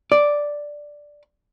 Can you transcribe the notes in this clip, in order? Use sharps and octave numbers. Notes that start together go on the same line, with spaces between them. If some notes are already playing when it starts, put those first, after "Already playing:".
D5